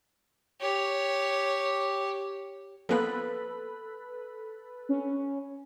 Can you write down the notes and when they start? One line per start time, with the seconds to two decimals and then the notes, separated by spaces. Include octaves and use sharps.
0.61 G4 C#5
2.89 F3 A#3 B3 A4 B4 B5
4.89 C#4